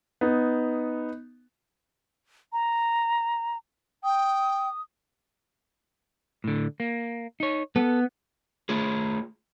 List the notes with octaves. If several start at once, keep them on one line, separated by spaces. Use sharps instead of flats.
B3 D#4
A#5
G5 D#6
A2 D3
A#3
D#4 C#5
B3 A4
A3 F4 G#4